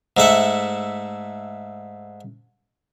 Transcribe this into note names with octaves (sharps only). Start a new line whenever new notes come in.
G#2 A3 E5 F#5